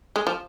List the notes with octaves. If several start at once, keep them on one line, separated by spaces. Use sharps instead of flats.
G#3
F3